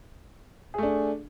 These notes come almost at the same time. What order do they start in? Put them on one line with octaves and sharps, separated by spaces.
G#4 A3 D4